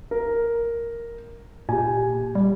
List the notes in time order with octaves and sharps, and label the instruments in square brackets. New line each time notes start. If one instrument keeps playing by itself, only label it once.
[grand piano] A#4
[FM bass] A#2 [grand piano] G4 G#5
[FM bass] G3